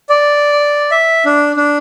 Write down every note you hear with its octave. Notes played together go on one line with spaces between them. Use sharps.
D5
E5
D4
D4